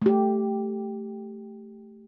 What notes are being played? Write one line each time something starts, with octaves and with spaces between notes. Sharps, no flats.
A3 G4